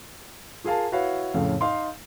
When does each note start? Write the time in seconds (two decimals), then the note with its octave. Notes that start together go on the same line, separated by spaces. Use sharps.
0.64 F4 G#4 A#4 F5 A5
0.92 E4 F#4 B4 C#5 F5
1.34 F2 A2 C#3 F5
1.61 D#4 F5 C6